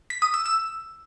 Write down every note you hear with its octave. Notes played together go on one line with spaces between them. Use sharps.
B6
D#6
E6
E6